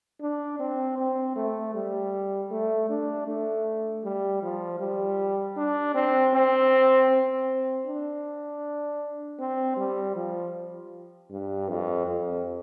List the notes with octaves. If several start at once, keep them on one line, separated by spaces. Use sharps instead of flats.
D4
C4
C4
A3
G3
A3
D4
A3
G3
F3
G3
D4
C4
C4
C4
D4
C4
G3
F3
G2
F2
F2